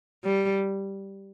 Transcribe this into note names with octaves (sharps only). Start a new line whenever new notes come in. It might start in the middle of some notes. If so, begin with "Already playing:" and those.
G3